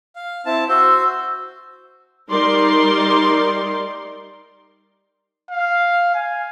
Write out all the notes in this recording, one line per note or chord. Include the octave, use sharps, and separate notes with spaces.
F5
C4 E4 A5
F#4 C5 E6
G3 D#4 A#4 D5 C6
F5
G#5